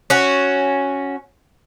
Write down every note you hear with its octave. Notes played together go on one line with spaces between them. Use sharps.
C#4 F#4